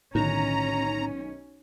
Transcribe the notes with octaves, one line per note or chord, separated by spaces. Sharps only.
B1 A2 D3 D#3 C#4 A#5